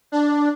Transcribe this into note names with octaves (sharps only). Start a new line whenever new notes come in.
D4